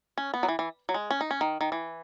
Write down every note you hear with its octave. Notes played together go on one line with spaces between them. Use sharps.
C#4
B3
F#3
E3
E3
F#3
G#3
C#4
D#4
C#4
D#3
D#3
E3